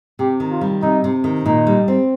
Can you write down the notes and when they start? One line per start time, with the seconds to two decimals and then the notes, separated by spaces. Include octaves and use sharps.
0.19 C3 G4
0.40 D#3
0.51 F4
0.61 G3
0.82 C3 D#4
1.04 C3
1.24 D#3
1.45 A#2 D#4
1.67 G3
1.88 C4